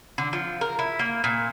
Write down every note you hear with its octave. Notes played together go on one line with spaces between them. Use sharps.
D3
F3
A#4
E4
A#3
A#2